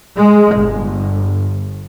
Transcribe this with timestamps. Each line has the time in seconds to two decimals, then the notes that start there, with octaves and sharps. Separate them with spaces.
0.17 G#3
0.56 G1